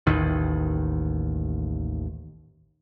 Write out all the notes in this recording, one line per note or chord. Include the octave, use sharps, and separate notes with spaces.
A1 D#2 D#3